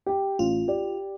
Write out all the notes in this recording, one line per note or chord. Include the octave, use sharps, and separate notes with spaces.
G4 G5
A1 F4
G4 D5